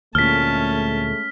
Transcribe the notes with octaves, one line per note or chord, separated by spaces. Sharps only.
D2 A#2 G#3 A3 C#4 A5 F6 B6